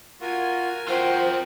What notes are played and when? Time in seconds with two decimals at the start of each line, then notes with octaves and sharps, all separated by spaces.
0.20 F4 F#4 A#4 G#5
0.88 F4 F#4 C5 G5 C6